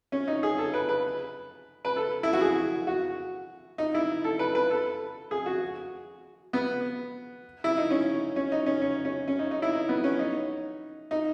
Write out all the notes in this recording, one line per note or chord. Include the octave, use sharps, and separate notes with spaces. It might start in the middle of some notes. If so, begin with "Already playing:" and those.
C#4
D#4
G#4
A4
B4
B4
B4
A4
E4
F#4
G#4
F#4
D#4
E4
A4
B4
B4
A4
G#4
F#4
B3
E4
D#4
C#4
C#4
D#4
C#4
C#4
C#4
C#4
D#4
D#4
E4
D#4
B3
C#4
D#4
D#4